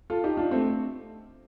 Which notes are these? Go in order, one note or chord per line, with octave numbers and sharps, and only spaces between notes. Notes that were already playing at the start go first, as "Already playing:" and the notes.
F4 A4
D#4 G4
D4 F4
A3 C4